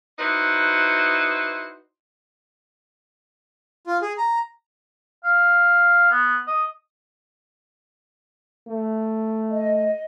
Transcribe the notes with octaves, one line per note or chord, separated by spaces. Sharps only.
D#4 E4 F#4 B4 C5
F4
G#4
A#5
F5
B3
D#5
A3
D#5